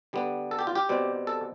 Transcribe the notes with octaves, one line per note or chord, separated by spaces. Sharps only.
D3 G3 B3
A4
G4
F4
G4
B2 G3 C4
A4